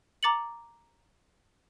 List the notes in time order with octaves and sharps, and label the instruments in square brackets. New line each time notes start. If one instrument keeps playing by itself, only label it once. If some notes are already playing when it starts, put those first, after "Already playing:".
[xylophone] A#5 D6 A6 C#7 F#7